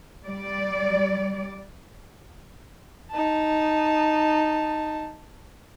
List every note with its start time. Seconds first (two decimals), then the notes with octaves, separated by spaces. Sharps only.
0.24 G3 D5
3.11 D#4 A5